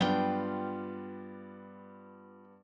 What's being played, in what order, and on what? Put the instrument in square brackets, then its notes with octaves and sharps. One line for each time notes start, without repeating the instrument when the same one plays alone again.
[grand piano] G2 B3 D4 [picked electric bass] F#3 [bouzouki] F4 G5